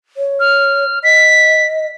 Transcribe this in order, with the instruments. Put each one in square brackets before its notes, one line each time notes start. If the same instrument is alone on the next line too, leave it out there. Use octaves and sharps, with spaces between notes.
[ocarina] C#5
[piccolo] F6
[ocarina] D#5 [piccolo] B6